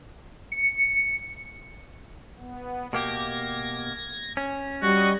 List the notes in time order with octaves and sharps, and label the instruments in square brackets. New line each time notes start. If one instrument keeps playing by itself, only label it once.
[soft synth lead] C#7
[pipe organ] B3
[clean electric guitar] B2 A#3 G4 [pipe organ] G#6 A#6
[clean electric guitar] C#4
[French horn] G3 [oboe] F#4 [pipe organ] D#5 C#6